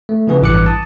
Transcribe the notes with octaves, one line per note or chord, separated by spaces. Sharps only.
A3
C#3 F3 B3 E4 G#4 B4
A1 G2 E3 D6 F#6 C#7
A5 D#6